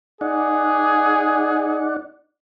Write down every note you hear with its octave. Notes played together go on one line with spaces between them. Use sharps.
D#4 G#4 D5 F#5